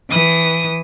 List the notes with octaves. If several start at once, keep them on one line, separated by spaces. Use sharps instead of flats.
E3 D#6